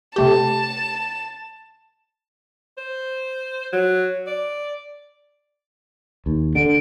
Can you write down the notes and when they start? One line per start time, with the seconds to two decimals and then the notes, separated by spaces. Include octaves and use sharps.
0.16 C3 A3 G4 A5
2.78 C5
3.73 F#3
4.27 D5
6.26 D#2
6.55 D3 D7